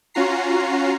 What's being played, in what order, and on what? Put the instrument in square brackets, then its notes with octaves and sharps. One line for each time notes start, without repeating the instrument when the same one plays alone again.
[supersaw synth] C#4 F4 F#4 A#5 C7